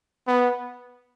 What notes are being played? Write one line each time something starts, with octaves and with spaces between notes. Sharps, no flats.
B3